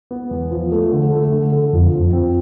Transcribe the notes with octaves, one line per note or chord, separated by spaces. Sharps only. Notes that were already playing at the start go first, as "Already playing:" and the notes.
B3
E2
F3
A3
D3
A3
D3
D3
F2 F3
F3
C4